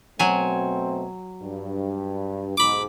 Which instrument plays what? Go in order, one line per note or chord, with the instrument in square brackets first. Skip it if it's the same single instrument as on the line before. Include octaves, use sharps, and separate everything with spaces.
[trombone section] B2 A3 C4 [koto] F#3 G#5
[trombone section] G2
[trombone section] B1 G#2 [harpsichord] B5 D6